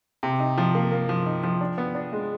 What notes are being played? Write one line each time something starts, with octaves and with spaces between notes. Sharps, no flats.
C3
D#4
F3
A#3
A#3
F3
D#4
F3
D4
B3
D4
G#3